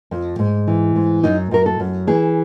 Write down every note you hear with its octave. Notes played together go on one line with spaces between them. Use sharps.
F2
G#2
E3
G#2
F#2 D#4
F#2 A#4
A4
F#2
E3 G#4